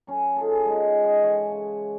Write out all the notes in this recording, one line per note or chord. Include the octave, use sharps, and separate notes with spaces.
F#3 C#4
F4 G#4 A4
G#3 D#4 F4
D#5 F#5 C6
E3 C#5 G#5
C#3